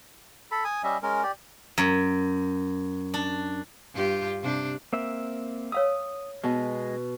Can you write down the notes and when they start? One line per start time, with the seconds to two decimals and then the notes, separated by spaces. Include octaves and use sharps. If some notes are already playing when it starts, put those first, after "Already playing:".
0.51 A4 B5
0.65 G#5 D#6
0.84 G3 C#4 D#5 E5
1.03 G#3 C#4 A#4
1.23 G4 D5
1.78 F#2
3.14 D4
3.93 G2 F4 G4
4.42 C3 D4 G4
4.93 A#3 C4 E5
5.72 C#5 F5 D#6 E6
6.44 B2 G#3 D#5